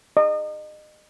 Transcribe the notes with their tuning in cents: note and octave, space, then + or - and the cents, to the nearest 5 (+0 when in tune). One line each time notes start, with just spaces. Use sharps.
D#5 -35